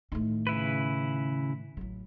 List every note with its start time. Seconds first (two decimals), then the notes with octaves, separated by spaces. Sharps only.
0.12 A2 D#3
0.47 C#3 E4 B4
1.77 A1 F#3